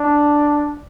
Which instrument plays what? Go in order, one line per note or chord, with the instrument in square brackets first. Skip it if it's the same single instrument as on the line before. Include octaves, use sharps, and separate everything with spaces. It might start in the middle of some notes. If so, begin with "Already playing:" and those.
Already playing: [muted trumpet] D4